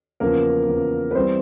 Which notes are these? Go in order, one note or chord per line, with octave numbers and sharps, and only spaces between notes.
E2 C#3 F3 A#3 A#4
E2 C#3 F3
B4
E3 G3 B3 C4 C5